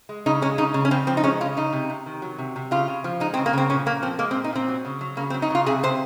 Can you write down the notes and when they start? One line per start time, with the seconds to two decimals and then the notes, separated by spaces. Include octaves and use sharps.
0.09 G#3
0.26 C#3 D#4
0.42 G#3 C#4
0.58 C#3 D#4
0.74 C#3
0.85 C#4
0.91 C#3 C4
1.07 F3 C4
1.17 D#4
1.24 G#3 C#4
1.40 C#3 F4
1.57 C#3 D#4
1.73 C3
1.89 C3
2.06 D#3
2.22 F#3
2.38 C3
2.56 C3
2.71 C#3 F4
2.88 C#3
3.04 F3
3.20 G#3 D#4
3.34 C4
3.37 C#3
3.46 A#3
3.53 C#3 C4
3.70 A#2 C#4
3.86 A#2 A#3
4.02 F3 C4
4.19 G#3 A#3
4.31 C4
4.36 A#2
4.44 D#4
4.53 A#2 C4
4.68 F#3
4.85 C#3
5.01 F#3
5.17 C#3 A#3
5.30 C4
5.34 F#3
5.42 D#4
5.50 C#3 F4
5.66 C3 G#4
5.83 C3 C5